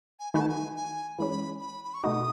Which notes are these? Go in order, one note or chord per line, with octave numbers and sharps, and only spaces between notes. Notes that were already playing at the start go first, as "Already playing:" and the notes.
G#5
D#3 A3 D#4 F#4 B4 G#5
A5
G#5
G#5
E3 G#3 C#4 B5
B5
B5
C#6
B2 A3 D#4 F#4 D#6